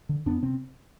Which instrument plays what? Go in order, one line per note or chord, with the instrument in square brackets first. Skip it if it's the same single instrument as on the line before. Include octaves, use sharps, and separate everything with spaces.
[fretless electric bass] D3
F2 B3 D4
C3 C4